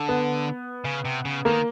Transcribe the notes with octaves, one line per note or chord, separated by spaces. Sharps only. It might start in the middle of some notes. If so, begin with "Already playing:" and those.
Already playing: D3
B3
C#3
C3
C#3
D#3 A#3